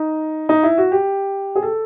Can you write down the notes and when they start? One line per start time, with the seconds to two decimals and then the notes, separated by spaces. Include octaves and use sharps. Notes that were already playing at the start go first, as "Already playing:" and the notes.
Already playing: D#4
0.49 D#4
0.63 E4
0.78 F#4
0.92 G4
1.55 G#4
1.62 A4